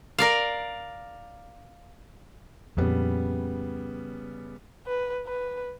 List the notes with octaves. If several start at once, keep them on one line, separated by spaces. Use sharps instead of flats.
A#4 D5 F5
F2 A#2 C#3 G3 B3
B4
B4